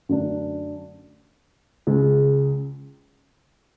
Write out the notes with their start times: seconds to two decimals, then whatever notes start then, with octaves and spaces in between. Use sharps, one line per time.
0.09 F#2 D3 A3 D4
1.87 C#2 C#3 G#3